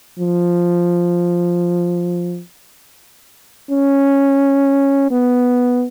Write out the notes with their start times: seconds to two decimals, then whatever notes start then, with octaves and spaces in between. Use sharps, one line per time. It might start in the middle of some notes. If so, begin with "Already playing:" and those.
0.19 F3
3.71 C#4
5.11 B3